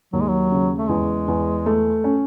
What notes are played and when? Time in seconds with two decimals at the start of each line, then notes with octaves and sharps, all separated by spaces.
0.13 D#2 F#3
0.20 G#3
0.28 F#3
0.52 C#3
0.78 A3
0.89 E2 G#3
1.28 E2
1.66 A3
2.04 C#4